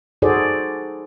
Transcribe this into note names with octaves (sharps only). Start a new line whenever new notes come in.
D#4 F#4 G#4 A4 C5 D5